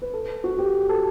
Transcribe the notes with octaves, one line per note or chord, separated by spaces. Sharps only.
B4
A4
F#4
G4
A4